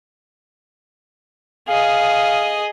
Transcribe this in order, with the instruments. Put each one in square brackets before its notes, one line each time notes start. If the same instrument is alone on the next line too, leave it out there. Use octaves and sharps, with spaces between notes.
[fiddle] G#4 D#5 [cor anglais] F5